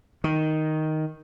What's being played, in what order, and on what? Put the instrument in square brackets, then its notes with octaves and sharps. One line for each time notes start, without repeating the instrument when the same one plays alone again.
[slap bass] D#3